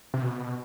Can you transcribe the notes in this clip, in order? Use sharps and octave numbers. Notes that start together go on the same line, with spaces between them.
C3
B2